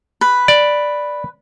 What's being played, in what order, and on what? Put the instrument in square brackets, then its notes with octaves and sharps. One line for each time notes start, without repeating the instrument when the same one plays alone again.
[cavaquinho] B4
[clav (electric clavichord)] D5